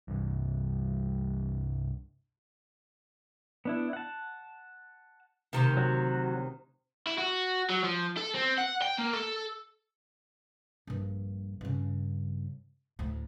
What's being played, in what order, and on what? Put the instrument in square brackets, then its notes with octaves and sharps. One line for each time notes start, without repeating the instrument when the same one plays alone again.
[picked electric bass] C2 G2
[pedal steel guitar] B3 D4 E4
F#5 A5
[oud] D2 C3 D#3
[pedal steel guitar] F#3 F#4
[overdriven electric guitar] E4
F#4
F#3
F3
A4
C4
F#5
G5
A#3
A4
[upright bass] A#1 G2
G2 C#3
D2 A2